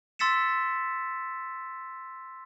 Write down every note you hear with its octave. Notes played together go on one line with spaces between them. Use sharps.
C6 E6 A6 B6 C#7 E7